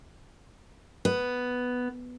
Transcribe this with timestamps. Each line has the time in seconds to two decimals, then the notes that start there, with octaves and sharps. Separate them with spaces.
1.05 B3